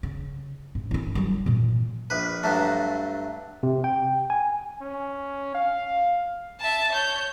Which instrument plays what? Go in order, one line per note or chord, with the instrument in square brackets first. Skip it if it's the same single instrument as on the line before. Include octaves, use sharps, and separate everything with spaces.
[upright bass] C#3
G#2
C#4 E4
F#3 G3
A#2 E3
[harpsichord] A#1 B4
G2 F#3 A3
[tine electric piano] C3
G5
G#5
[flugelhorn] C#4
F5
[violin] E5 A5
C#5 G6